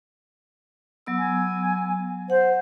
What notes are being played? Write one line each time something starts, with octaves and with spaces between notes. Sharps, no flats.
F#3 B3 E6
G#5
C5 F#5